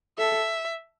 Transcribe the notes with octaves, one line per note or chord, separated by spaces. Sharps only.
A4 E5